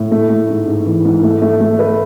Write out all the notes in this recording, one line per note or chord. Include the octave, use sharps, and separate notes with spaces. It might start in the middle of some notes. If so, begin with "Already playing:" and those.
Already playing: A2
A3
A3
G#2
G#2
E3
G#2
A3
A3
A3
B4